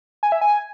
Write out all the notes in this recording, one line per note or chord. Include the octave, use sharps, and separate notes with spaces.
G#5
E5
G#5